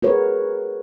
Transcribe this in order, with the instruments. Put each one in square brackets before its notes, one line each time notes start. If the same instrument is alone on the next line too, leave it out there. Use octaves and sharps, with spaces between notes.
[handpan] F#4 G#4 A#4 B4 C#5